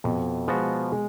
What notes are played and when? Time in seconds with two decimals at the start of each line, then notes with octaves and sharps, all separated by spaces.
0.04 F2 B2
0.48 F3 G#3 B3 F#4
0.92 G#3